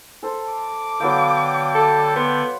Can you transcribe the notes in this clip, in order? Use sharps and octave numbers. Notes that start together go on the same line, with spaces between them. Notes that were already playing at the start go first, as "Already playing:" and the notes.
A4 C5
D6
D3 F#3 B3 F5 G5
A4
B3 C6